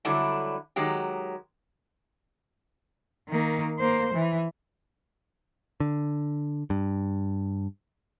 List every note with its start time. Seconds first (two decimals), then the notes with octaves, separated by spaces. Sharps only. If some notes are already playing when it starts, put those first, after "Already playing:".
0.05 D3 F#3 G3 A3 D4 E4
0.76 D#3 F#3 G#3 G4
3.29 D#3 A#3
3.78 A#3 C5
4.14 E3
5.80 D3
6.70 G2